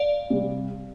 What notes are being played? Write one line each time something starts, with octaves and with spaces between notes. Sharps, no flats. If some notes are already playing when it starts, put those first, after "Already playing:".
Already playing: D5 F5
C3 G3